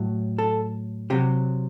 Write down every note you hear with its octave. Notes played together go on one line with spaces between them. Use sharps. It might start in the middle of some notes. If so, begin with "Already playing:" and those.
Already playing: A2 F#3
A4
C3 F#3 G4